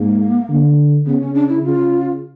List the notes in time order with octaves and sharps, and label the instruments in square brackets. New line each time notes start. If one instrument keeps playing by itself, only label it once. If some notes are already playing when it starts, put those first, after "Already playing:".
Already playing: [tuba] G#2 [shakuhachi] A#3
[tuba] D3
[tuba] C#3 [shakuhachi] B3
[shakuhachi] C#4
D4
E4
[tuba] C#3 [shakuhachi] F4